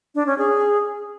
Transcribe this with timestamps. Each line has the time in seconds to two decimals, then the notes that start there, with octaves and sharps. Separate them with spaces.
0.15 D4
0.27 C#4
0.38 G#4